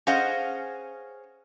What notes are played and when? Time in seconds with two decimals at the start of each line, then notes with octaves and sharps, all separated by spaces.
0.07 C#4 G#4 C5 D#5 F5 F#5